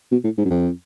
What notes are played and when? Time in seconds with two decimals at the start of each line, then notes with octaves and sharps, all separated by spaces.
0.12 B2
0.24 A2
0.38 G#2
0.45 F#2
0.50 F2